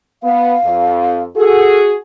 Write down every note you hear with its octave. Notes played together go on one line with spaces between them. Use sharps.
B3 F5
F2
F#4 G#4 A4